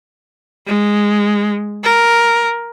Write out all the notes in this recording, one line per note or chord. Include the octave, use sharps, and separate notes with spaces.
G#3
A#4